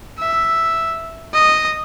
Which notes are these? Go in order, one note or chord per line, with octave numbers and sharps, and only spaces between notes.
E5
D#5